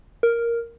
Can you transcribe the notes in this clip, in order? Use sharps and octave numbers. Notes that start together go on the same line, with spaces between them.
A#4